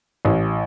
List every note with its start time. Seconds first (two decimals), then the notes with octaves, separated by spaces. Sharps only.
0.25 A1